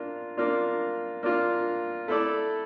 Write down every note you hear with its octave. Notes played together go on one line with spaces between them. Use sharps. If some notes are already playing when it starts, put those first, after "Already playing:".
Already playing: A#3 D4 F4
A#3 D4 F4
A#3 D4 F4
A3 E4 A4 D5